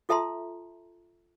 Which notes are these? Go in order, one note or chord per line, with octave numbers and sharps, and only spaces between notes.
F4 A4 E5 A5 A#5 C6